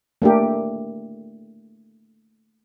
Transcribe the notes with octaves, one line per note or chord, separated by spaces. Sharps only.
A3 A#3 D4 G4